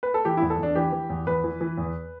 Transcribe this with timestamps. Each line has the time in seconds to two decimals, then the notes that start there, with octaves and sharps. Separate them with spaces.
0.03 B4
0.14 A4
0.25 E3 G4
0.37 E2 E4
0.50 A4
0.59 E2 D4
0.75 E3 G4
0.92 E3
1.10 E2
1.27 E2 B4
1.44 E3
1.61 E3
1.77 E2